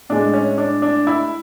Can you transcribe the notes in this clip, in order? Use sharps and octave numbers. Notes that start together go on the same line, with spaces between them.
A2 G#3 D4
C#4
D4
D4
E4